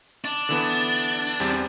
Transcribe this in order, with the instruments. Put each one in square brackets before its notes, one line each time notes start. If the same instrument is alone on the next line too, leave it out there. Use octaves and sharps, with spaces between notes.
[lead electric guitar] D4
[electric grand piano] D3 E3 B3
E2 G3 C4